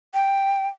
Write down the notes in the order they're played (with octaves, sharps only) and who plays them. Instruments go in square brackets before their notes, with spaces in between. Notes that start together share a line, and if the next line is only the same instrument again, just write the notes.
[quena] G5